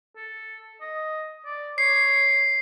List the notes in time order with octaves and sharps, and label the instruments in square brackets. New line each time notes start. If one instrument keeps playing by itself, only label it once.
[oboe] A4
D#5
D5
[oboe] C#5 [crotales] C7